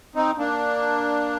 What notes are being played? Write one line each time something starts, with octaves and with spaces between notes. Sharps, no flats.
C4 D#4
A#3 D4